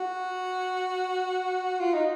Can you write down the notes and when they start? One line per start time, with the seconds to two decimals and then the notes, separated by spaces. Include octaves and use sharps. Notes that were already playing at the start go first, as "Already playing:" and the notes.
Already playing: F#4
1.80 F4
1.94 D#4